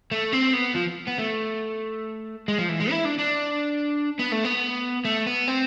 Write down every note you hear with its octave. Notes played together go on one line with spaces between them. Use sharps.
A3
C4
B3
F3
B3
A3
G#3
F3
E3
G#3
E4
D4
D4
B3
A3
B3
A3
B3
C4